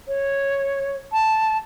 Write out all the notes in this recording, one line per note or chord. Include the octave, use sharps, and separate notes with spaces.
C#5
A5